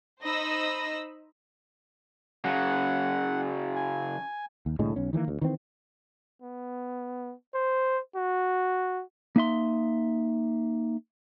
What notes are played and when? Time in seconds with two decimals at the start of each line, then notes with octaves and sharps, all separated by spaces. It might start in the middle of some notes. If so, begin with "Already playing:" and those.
0.21 D#4 C5 D#5 B5 E6 A#6
2.44 C#3 F#3 F#5
3.76 G#5
4.66 D#2
4.79 C2 A2 D3 G#3
4.96 B1 C#4
5.13 D#3 E3 G3 A#3
5.28 D2
5.41 D#3 E3 C4
6.42 B3
7.55 C5
8.16 F#4
9.36 A#3 D#4 E5 C6